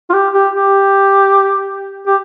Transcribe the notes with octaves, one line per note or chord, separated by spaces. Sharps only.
F4
G4
G4
G4
G4